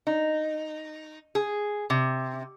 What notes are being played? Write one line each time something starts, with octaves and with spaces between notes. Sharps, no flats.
D#4
G#4
C3